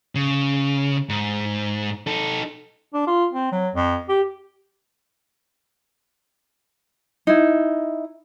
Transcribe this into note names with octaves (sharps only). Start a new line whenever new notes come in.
C#3
G#2
D#4 A4
D4
F4
C4
F#3
F2
G4
D#4 E4